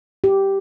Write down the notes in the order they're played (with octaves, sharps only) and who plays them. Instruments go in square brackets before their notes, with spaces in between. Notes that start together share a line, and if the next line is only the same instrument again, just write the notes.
[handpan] G4